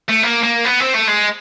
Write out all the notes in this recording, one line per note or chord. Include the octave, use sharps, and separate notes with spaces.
A3
A#3
A#3
B3
C4
A3
G#3